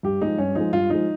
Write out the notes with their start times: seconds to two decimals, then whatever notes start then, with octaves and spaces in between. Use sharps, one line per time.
0.03 G2 G4
0.21 F3 G#3 D#4
0.38 G2 C#4
0.55 F3 G#3 D#4
0.73 G2 F4
0.90 F3 G#3 D#4